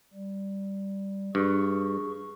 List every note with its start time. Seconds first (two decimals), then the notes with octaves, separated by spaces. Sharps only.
0.14 G3
1.35 G2 G#4 C#6